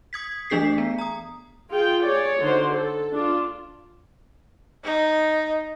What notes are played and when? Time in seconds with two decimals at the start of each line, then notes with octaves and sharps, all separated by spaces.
0.13 D#6 G#6 B6
0.50 E3 A3 D4 G#4 B6 C7
0.78 B3
0.98 A#5 D#6
1.71 F4 G#4 G5
2.05 G#4 C#5 D5
2.41 D3 D#4 F#4 C5
2.75 A4
3.13 D4 F4
4.84 D#4